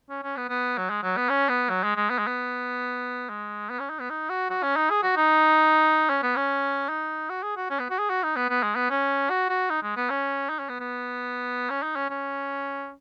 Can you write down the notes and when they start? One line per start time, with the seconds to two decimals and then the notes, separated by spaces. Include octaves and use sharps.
0.10 C#4
0.23 C#4
0.37 B3
0.49 B3
0.78 F#3
0.90 G#3
1.03 F#3
1.17 B3
1.29 C#4
1.49 B3
1.70 F#3
1.83 G#3
1.96 G#3
2.10 B3
2.19 G#3
2.27 B3
3.29 G#3
3.70 B3
3.80 C#4
3.90 D#4
4.00 B3
4.10 D#4
4.30 F#4
4.50 F#4
4.63 C#4
4.76 D#4
4.90 G#4
5.03 F#4
5.17 D#4
6.10 C#4
6.23 B3
6.36 C#4
6.89 D#4
7.30 F#4
7.43 G#4
7.57 F#4
7.70 C#4
7.80 B3
7.90 F#4
7.99 G#4
8.10 F#4
8.23 D#4
8.36 B3
8.50 B3
8.63 G#3
8.76 B3
8.90 C#4
9.30 F#4
9.49 F#4
9.70 D#4
9.83 G#3
9.96 B3
10.10 C#4
10.50 D#4
10.60 C#4
10.69 B3
10.80 B3
11.70 C#4
11.83 D#4
11.96 C#4
12.10 C#4